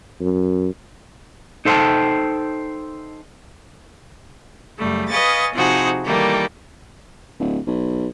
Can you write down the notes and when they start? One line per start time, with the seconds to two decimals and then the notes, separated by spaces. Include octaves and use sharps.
0.21 F#2
1.65 D#4 A4 C5 E5 G5 A5
4.79 F#2 C#3 G3 A3
5.10 B4 D#5 F5 G#5 C#6 A6
5.54 C3 F3 D#4 F#4 G#4
6.05 D#3 E3 G3 A3 A#3
7.40 D1
7.67 B1